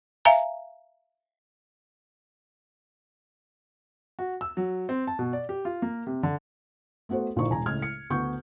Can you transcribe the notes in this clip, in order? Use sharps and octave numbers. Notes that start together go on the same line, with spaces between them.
E5 F5 G#5 A#5
F#4
E6
F#3
C4
A5
B2
D5
G4
F4
A#3
C3
D3
A3 B3 F#4 A4 C5
A#1 A#2 D3 D#4 C#6
E1 G#5 A#5
C#2 A2 F6 G#6
C#7
D2 B3 C#6 G6